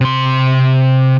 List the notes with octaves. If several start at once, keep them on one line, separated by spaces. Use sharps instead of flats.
C3 C6